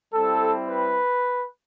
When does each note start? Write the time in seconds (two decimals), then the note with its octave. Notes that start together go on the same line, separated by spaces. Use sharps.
0.14 G3 C4 E4 A4
0.69 B4